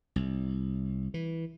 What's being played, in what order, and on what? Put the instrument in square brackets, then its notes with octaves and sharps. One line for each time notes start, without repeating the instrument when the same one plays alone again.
[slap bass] C2
E3